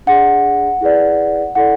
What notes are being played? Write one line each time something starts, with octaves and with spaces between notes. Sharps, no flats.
D4 G#4 D5 F#5
E4 G#4 B4 D5
E4 A4 D5 F#5